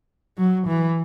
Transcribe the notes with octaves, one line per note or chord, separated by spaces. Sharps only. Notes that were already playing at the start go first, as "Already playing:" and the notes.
F#3
E3